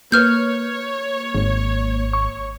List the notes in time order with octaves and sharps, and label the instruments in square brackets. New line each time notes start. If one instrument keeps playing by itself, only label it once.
[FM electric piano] A#3 [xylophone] B4 F6 G6 [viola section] C#5
[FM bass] G#1
[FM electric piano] C#6